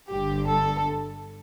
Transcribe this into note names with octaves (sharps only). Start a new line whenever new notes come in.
G1 G2 D3 G4
A4